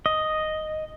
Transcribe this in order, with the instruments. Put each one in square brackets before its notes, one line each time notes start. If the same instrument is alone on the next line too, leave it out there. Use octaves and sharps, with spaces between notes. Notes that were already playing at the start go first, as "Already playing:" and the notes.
[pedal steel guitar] D#5